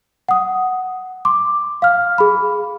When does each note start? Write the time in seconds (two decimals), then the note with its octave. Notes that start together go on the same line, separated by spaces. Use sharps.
0.28 F#5 D#6
1.25 C6 D6
1.82 F5 F6
2.18 G#4 B5